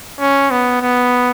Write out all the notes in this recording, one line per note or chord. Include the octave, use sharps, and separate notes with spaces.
C#4
B3
B3